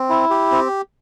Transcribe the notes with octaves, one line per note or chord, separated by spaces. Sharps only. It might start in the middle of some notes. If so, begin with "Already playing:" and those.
Already playing: C4
E4
G4
C4